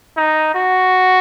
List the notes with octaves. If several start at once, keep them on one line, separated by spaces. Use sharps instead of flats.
D#4
F#4